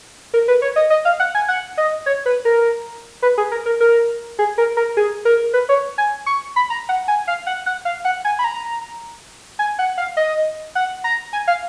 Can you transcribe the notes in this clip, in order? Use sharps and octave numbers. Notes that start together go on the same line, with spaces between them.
A#4
B4
C#5
D#5
D#5
F5
F#5
G#5
F#5
D#5
C#5
B4
A#4
B4
G#4
A#4
A#4
A#4
G#4
A#4
A#4
G#4
A#4
B4
C#5
G#5
C#6
B5
A#5
F#5
G#5
F5
F#5
F#5
F5
F#5
G#5
B5
A#5
G#5
F#5
F5
D#5
F#5
A#5
G#5
F5